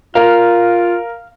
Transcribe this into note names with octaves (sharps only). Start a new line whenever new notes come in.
F4 A#4 F5